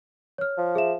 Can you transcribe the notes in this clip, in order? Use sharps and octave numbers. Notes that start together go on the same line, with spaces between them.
C#5 F6
F3
G#4 E5 E7